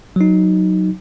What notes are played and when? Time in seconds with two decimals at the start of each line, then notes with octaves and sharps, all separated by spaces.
0.16 F#3 D#4